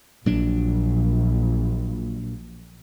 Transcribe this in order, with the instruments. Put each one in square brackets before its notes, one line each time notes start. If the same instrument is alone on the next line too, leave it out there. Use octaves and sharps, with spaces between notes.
[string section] A#1 [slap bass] A#2 F#3 D4